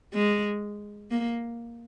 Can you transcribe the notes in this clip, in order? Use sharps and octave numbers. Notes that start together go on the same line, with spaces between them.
G#3
A#3